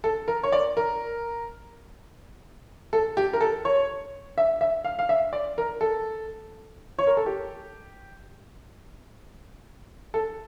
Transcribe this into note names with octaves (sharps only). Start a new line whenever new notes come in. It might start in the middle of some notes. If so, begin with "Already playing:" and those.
A4
A#4
C#5
D5
A#4
A4
G4
A#4
A4
C#5
E5
E5
F5
F5
E5
D5
A#4
A4
C#5
A#4
A4
G4
A4